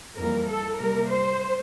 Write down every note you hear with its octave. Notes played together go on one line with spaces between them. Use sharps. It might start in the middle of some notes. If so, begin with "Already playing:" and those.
F2 E3 G3 A#3 A#4
A4
C3 G3 A#3 A#4
C5